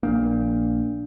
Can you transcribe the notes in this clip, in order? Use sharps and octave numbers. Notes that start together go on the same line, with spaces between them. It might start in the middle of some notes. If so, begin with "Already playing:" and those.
A#1 A#3 D4